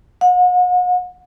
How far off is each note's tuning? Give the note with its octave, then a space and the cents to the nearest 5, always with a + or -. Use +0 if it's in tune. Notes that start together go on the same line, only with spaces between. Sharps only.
F#5 -40